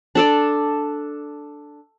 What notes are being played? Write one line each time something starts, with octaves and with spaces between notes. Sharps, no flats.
D4 A4 D5